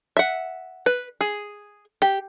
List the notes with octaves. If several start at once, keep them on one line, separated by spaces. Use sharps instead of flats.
E5 F#5
B4
G#4
G4